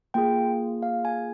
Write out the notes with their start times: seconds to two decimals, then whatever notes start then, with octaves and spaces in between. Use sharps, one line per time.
0.14 A#3 F4 G#4 G5
0.83 F5
1.05 G#5